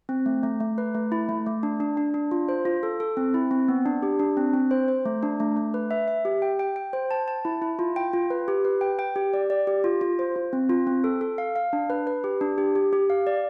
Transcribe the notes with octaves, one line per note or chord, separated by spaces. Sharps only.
C4
A3
A3
A3
B4
A3
E4
A3
A3
D4
D4
D4
D4
F4
C5
F4
A4
A4
C4
E4
C4
B3
D4
G4
D4
C4
C4
C5
C5
A3
D4
A3
A3
B4
E5
E5
G4
G5
G5
G5
C5
A5
A5
E4
E4
F4
G5
F4
B4
G4
B4
G5
G5
G4
D5
D5
G4
F4
F4
C5
F4
C4
F4
C4
A4
A4
F5
F5
D4
B4
B4
G4
D4
G4
G4
G4
F5
D5